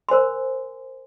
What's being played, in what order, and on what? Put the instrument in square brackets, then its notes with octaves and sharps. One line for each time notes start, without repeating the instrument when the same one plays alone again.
[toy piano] A#4 C5 G#5 C6